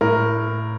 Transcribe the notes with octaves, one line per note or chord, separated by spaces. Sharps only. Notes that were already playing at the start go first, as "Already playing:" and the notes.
A2 A#4